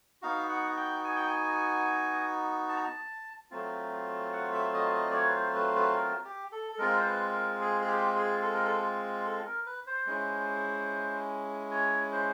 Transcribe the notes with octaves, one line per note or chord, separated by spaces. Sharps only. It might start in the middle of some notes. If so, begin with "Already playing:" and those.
B3 D#4 F#4 F5
F#5
G5
G#5
G5
G#5
A5
A#5
A5
F#3 A3 C4 F4
F#5
E5
D#5
D#5
D5
C#5
B4
C5
B4
B4
A#4
G4
A4
A4
G#3 C4 F4 A#4
C5
B4
A#4
G#4
G#4
G4
G#4
A4
A#4
A4
A4
A#4
B4
C5
G#3 C#4 E4
C#5
C5